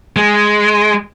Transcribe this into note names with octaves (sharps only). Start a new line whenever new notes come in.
G#3